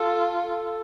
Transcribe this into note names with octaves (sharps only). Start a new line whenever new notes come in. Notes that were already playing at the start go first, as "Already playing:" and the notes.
Already playing: F4 A4
A4